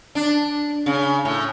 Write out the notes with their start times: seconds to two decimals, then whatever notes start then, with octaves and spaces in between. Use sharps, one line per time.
0.15 D4
0.86 C#3
1.25 A2